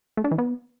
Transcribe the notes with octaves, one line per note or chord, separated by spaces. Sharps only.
A3
D4
E3
B3